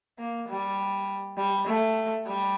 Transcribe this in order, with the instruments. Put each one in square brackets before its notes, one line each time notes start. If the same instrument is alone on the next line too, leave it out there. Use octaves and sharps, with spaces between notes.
[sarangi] A#3
G3
G3
A3
G3